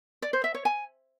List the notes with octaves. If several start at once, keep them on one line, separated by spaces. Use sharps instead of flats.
D5
C5
E5
C#5
G#5